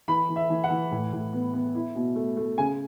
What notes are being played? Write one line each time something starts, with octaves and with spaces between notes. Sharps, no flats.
E3 B5
E3
E5
E3
F#5
E3
A2
A2
B3
B3
E4
B2
A3
A3
C#3 G#5